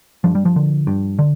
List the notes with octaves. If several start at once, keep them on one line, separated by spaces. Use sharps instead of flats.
G2 F3
G3
F3
D3
G2
D3